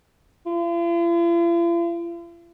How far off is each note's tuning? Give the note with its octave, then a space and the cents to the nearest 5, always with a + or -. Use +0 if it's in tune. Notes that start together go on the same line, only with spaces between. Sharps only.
F4 -45